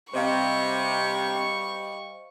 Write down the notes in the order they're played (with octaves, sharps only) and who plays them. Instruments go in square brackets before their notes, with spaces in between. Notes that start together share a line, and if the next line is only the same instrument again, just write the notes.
[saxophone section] C3 [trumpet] G3 [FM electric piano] C5 D#5 F5 [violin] C#6